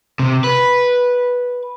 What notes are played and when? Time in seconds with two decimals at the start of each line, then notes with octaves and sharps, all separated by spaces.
0.19 C3
0.44 B4